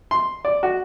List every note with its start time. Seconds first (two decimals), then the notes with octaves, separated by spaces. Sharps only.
0.11 C6
0.45 D5
0.63 F#4